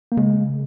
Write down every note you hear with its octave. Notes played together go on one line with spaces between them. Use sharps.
A#3
C#3 G#3